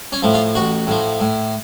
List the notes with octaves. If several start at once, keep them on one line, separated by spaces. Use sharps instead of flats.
C#4
A2 F3
F4
A1 F#4
A2 F3
A2